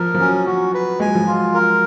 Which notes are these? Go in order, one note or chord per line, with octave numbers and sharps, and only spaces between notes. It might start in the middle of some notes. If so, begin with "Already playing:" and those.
Already playing: F3 A#4
F3
F#3 C#4
F#3 F#4
B4
G#3 G#5
F#3
F3
F#3 F4
A#4